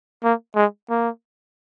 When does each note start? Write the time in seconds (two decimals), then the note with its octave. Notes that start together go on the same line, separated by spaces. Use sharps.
0.24 A#3
0.55 G#3
0.90 A#3